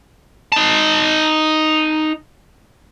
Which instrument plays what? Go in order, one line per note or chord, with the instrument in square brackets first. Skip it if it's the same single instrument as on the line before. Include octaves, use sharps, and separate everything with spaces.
[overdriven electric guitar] D#4 A5